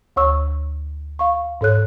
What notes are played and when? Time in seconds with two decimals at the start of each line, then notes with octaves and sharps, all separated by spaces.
0.16 D2 C#5 C#6 E6
1.19 F5 C#6
1.61 G#2 A4 C#5 F#6